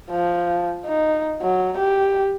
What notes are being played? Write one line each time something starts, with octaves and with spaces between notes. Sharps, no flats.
F3
D#4
F#3
G4